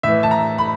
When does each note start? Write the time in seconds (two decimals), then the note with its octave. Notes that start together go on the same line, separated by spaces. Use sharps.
0.03 A2 E3 E5
0.23 A5
0.31 A#5
0.58 B5